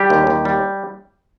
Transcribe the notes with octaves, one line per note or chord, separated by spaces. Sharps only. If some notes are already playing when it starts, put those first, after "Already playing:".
Already playing: G3 G4
D#2
D#2
G3